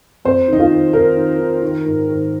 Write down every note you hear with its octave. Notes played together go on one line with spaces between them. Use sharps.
F2 C5
D#3 D#4
F4
D#3
D#3 A#4
D#3
D#3
D#3
G#2
D#3